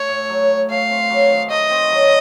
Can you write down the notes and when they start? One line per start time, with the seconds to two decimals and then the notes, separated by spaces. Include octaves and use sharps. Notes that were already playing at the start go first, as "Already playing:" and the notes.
Already playing: A3 C#5
0.09 A2
0.29 F#3
0.49 A2
0.70 A3 F5
0.90 C4
1.10 F#3
1.30 D#3
1.50 A3 D#5
1.70 C4
1.91 F#3